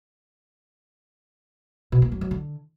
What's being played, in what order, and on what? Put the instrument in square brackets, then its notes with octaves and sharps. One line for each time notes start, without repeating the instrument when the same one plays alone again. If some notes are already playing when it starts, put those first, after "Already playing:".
[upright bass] B2
A#3
F#2
F#3
D3